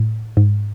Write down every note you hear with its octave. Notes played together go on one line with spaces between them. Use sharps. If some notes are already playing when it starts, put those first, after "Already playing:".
Already playing: A2
G#2